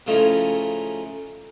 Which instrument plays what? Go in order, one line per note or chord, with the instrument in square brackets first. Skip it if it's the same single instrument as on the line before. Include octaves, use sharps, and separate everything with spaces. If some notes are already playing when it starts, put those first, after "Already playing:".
[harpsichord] C#3 F3 A3 C#4 D#4 E4